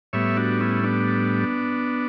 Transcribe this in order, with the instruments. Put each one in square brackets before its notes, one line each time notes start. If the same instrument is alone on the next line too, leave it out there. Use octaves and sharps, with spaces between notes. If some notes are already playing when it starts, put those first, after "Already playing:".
[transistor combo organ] A2 G3 B3 C#5 E5
D4 F#4
C#4 E4
B3 D4